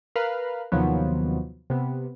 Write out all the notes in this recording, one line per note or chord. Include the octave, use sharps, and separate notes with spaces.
A#4 B4 F5
D#2 C3 D#3 F3 F#3 B3
C3 B3